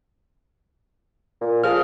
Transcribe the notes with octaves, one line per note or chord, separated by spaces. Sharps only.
A#2
F3 G#4 F6